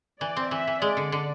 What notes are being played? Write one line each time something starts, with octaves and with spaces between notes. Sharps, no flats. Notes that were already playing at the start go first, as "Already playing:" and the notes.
E3 D5
C4
E3 E5
E3
G#3 D5
D3
D3